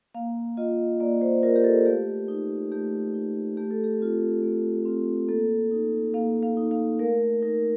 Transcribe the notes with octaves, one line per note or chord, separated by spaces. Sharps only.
A#3 F5
F4 D#5
A#3 D5
C5
F4 A#4
G4
A4
A3 G4
D#4
A3 G4
D#4
A3 G4
A4
G4
C4 F4
A3
C4 F4
A#3 A4
D#4
A#3 F5
F5
D#4
F5
A3 A#4
D#4 A#4